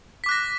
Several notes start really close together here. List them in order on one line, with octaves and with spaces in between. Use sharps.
B6 D6 F#6 A#6